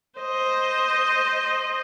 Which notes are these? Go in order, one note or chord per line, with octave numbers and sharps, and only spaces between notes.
C5 D#5